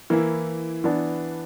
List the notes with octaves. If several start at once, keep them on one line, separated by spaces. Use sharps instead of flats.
E3 A#3 E4
E3 B3 D4